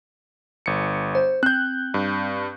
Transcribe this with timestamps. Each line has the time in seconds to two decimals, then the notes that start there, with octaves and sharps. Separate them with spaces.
0.66 G1 C#7
1.15 C5
1.43 C4 F#6 G6
1.94 G2